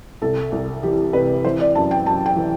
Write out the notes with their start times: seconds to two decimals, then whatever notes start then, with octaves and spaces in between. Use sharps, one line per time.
0.22 C2 A4
0.52 C2
0.83 E3 G4
1.13 C3 B4
1.45 E3 C5
1.60 D5
1.75 F#2 A5
1.91 G5
2.06 F#2 A5
2.26 G5
2.36 E3